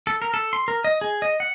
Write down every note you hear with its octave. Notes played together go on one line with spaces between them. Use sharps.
A4
A#4
A4
C6
A#4
D#5
G#4
D#5
F#5